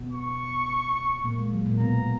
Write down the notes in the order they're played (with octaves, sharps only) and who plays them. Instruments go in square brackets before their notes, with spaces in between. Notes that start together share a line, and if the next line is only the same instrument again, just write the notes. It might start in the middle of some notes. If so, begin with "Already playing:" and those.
Already playing: [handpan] B2 B3
[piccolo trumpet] C#6
[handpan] A#2 A#3
G#3
F#3
A#2 A#3
[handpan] B2 B3 [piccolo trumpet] A#5